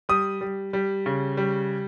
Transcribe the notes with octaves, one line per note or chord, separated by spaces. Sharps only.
G3 D#6
G3
G3
C#3
G3